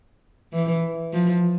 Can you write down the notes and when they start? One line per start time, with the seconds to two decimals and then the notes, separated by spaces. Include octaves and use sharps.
0.53 E3
1.13 F3